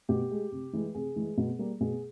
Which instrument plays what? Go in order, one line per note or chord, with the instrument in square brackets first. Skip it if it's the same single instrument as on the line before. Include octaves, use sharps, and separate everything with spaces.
[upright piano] B2 G4
G#3
C3
E3 G#3
C3 G#4
E3 G#3
B2
G3 A#3
B2 G#4